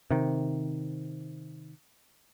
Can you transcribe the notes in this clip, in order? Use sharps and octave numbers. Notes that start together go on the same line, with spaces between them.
C3 D#3